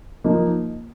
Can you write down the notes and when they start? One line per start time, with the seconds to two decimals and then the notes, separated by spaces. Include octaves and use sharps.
0.24 F3 A#3 D#4